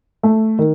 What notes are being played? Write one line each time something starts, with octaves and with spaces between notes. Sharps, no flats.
A3
D#3